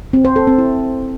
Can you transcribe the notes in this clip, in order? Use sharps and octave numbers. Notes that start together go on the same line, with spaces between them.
C4
C5
A4
C4
E4